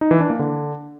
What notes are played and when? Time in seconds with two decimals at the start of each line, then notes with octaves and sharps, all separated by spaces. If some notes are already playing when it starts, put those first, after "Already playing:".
0.01 D#4
0.11 E3
0.20 D4
0.30 A#3
0.39 D3